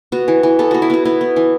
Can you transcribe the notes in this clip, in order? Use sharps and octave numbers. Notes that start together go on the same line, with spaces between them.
B3 F#4
E3
E3
B3 A4
B3 F#4
E4
B3 F#4
B3 E4
B3
E3